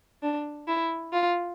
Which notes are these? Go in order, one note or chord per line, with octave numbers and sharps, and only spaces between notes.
D4
E4
F4